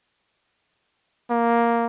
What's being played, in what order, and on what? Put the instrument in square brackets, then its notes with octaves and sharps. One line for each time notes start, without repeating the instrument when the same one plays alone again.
[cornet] A#3